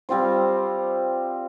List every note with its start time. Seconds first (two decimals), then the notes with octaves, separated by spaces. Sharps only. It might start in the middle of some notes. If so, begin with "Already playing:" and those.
0.09 G3 C4 F4 C5